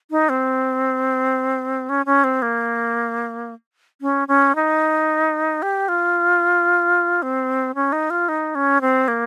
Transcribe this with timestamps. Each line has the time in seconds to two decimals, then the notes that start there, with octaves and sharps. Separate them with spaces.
0.11 D#4
0.29 C4
1.89 C#4
2.06 C#4
2.24 C4
2.42 A#3
4.01 C#4
4.28 C#4
4.55 D#4
5.62 G4
5.88 F4
7.22 C4
7.75 C#4
7.92 D#4
8.10 F4
8.29 D#4
8.55 C#4
8.81 C4
9.08 A#3